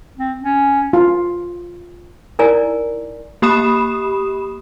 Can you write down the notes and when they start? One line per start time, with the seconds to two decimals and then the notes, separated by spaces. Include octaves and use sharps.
0.18 C4
0.43 C#4
0.93 F4
2.39 D#4 E4 A#4 D5 G#5 A#5
3.42 A#3 G4 B5 D#6 E7